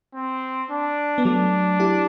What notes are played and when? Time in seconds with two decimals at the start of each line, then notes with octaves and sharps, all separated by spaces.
0.15 C4
0.70 D4
1.18 B3
1.25 F#3 A3 D4
1.80 E4 G4